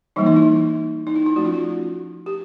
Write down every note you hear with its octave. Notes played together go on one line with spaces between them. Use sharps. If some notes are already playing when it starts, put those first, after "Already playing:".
E3 G3 A#3 D#4
D#4
E4
D#4
E4
E4
F3 A3 C#4 F#4
F4
F#4
G4